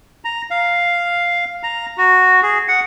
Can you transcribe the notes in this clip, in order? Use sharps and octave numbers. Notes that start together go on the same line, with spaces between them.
A#5
F5
A#5
F#4
G#4
F#5